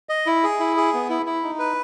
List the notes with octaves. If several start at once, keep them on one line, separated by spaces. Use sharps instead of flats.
D#5
E4
G#4
E4
G#4
B3
E4
E4
D#4
B4